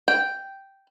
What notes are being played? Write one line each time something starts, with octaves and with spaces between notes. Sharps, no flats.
G5